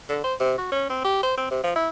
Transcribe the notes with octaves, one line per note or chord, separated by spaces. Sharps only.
D3
C5
C3
F#4
C#4
C4
G4
C5
C4
C3
F3
E4